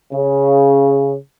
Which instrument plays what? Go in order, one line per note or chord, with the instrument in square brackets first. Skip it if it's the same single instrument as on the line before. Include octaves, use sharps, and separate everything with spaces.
[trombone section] C#3